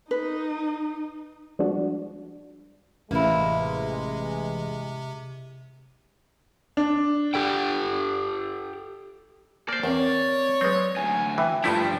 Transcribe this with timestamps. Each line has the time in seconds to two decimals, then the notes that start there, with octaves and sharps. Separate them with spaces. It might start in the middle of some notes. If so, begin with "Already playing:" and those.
0.11 D#4 B4
1.59 F3 G3 G#3 D4 F#4
3.11 A1 C3 G#3 A#3 E4
6.77 D4
7.34 G4 A4 G5
9.69 A#3 C5 D5
9.83 E2 C4 A#4 C#5
10.61 F#3 G#3 C4 B4
10.97 D2 G#5
11.38 E3 B4 E5 G5
11.64 G2 F3 A3 D4 E4 G4